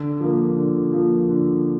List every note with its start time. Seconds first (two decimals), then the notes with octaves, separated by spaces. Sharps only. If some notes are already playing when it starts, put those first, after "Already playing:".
Already playing: D3
0.20 F3 A#3
0.56 D3
0.92 F3 A#3
1.29 D3